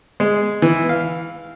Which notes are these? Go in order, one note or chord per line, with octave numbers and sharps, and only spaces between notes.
G#3
E3
F5